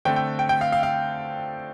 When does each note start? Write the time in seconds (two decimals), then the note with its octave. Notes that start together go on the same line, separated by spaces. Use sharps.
0.05 D3 A3 C4 G5
0.16 G5
0.39 G5
0.49 G5
0.61 F5
0.72 F5
0.83 F5